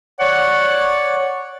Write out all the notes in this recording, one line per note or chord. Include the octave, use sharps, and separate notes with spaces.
C#5 D5 F#5